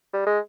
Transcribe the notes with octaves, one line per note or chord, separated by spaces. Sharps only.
G3
G#3